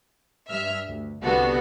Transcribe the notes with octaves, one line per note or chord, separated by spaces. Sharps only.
G2 E5 F6
D2
C2 D3 G3 B3 F#4 A4